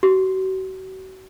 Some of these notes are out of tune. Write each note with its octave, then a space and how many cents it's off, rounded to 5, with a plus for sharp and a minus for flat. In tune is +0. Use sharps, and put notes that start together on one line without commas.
F#4 +35